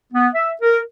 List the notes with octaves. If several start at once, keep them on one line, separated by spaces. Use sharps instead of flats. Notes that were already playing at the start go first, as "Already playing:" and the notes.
B3
E5
A#4